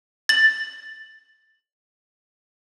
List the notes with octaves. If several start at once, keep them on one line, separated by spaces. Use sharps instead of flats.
A6 F#7